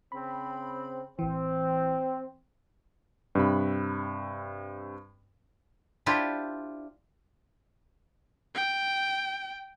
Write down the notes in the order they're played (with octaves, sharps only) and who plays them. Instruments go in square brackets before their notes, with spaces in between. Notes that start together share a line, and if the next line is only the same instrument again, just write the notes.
[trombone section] C#3 C4 [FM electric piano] B5
[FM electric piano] A1 E3 [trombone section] C4
[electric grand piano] G2 C3 B5
[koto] D4 E4 F4 G4 C5
[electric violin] G5